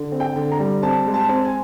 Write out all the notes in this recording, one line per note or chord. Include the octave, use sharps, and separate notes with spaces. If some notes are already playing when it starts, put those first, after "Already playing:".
Already playing: D3
C4
G5
D3
A#5
G3
C4 A5
G#3
A5
C4
G#5